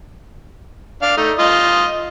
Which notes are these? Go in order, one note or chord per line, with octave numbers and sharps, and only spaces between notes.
D4 F5
A3 D#4
F4 D#5